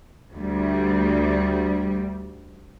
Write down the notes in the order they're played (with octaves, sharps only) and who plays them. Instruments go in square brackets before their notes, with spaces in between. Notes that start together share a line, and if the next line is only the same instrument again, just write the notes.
[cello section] D2 G3